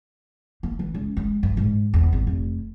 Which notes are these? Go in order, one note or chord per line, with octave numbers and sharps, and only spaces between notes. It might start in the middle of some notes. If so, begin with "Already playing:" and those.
A#3
E3
C#2
G#3
G2
G#2
E2
G#1
F1